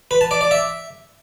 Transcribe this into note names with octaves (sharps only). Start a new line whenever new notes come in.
B4
A5
D5
D5
E5